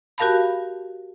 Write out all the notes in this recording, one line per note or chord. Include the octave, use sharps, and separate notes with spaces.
F#4 G4 A#4 F5 A5 B5